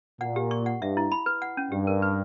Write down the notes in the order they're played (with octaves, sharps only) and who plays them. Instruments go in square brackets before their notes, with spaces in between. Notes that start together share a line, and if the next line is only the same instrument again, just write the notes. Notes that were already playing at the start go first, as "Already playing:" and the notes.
[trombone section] A#2 [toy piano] F#5
[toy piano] G4
C#6
F#5
[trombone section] G2 [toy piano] E5
[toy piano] E4
B5
B4
F#5
C#4
[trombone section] G2 [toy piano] G4
[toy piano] A#4
B4